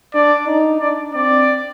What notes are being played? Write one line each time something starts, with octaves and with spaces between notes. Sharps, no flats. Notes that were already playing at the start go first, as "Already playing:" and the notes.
D4 D5
D#4
D4 D5
C4 D5